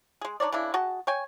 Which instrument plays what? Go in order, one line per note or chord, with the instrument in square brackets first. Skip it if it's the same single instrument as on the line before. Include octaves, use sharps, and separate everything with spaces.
[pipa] G#3 G#4
D4 D#4 C#5 D5
C#3 E3 D4 E4
F#4 G#4 D#5 A5
C#5 G5 G#5